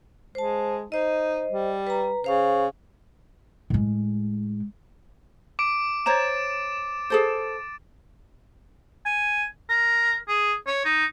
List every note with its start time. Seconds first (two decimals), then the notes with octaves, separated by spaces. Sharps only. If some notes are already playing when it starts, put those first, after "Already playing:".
0.35 G#3 C5 A5
0.92 D#4 C5 D#5
1.51 G3
1.87 B4 A#5
2.24 C#3 C5 F5 C#6
3.70 A2 G#3
5.59 D6 D7
6.06 C5 C#5 A#5 A6 E7
7.10 G#4 A4 C5
9.06 G#5
9.69 A#4
10.28 G#4
10.67 C#5
10.85 D#4